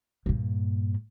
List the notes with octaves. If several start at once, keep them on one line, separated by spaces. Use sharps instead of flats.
G2 A#2